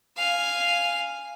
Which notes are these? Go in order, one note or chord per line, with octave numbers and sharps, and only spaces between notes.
F5 G#5